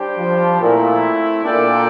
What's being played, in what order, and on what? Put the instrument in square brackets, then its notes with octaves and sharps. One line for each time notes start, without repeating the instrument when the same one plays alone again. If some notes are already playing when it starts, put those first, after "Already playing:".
Already playing: [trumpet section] G3 D4 G4 C5 G5
[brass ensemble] F3
[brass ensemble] A#2 [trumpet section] A3 C4 E4
[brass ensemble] A#2 [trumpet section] D4 A4 D5 G5